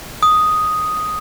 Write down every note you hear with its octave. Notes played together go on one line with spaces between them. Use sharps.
D#6